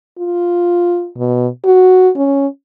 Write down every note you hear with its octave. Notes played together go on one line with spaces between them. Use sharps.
F4
B2
F#4
C#4